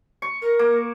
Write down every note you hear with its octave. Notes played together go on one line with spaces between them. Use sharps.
C#6
A#4
A#3